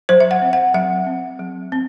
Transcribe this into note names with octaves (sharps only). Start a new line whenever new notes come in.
F#3 C5
E5
F#5
C4
F#5
F#3 E5
C4
F#3
C4